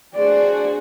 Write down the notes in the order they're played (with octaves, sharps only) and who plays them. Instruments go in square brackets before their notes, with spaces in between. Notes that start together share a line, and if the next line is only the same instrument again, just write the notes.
[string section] A3 D4 F#4 [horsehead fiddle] G#4 C5 [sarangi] D5